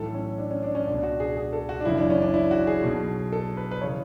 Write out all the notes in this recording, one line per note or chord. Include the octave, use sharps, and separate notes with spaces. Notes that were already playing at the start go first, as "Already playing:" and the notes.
Already playing: B1 A2 E3 A4
C#4
D4
C#4
D4
C#4
C#2 B2 D4
F#4
G#4
G#4
A4
F#4
D4
F#1 F#2 C#3 E3 E4
D4
C#4
D4
E4
F#4
G#4
B1 B2
A4
B4
B4
C#3 E3 C#5